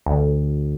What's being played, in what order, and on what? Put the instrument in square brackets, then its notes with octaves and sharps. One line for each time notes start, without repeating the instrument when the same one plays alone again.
[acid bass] D2